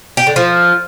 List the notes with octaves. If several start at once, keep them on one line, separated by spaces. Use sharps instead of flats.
G4
D3
F3